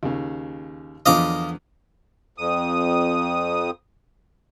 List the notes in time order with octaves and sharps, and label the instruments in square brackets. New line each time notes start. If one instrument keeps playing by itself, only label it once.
[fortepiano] D#2 C#3
[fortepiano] E2 D3 F3 [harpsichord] D#5 F5 D6
[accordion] F2 D#6